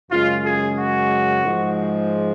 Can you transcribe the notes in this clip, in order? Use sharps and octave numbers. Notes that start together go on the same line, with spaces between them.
F#2 C#3 G#3 F4
G#4
F#4
G#2 F3 G#3